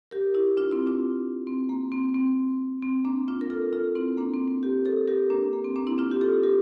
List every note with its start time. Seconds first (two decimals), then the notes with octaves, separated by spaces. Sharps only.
0.11 G4 A#4
0.34 E4 G4
0.57 D4 F4
0.72 C4 E4
0.87 D4 F4
1.47 C4
1.69 A#3
1.92 C4
2.15 C4
2.82 C4
3.05 A#3 D4
3.28 D4 F4
3.41 A#4
3.50 F4 A4
3.73 F4 A4
3.95 C4 E4
4.18 A#3 D4
4.34 C4
4.48 C4
4.63 G4 A#4
4.85 A4 C5
5.08 G4 A#4
5.30 A#3 D4
5.53 A#3
5.64 C4
5.76 A#3 D4
5.87 C4 E4
5.98 D4 F4
6.11 G4
6.21 F4 A4
6.43 G4 A#4